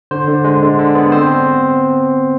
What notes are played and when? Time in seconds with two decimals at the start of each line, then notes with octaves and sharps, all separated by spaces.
0.11 D3 C5
0.28 D3
0.44 G#3
0.62 D3
0.79 D3
0.95 B3
1.12 C4 C5